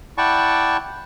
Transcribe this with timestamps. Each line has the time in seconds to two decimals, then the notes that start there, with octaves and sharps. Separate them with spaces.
0.18 E4 D5 F#5 G5 A5 C#6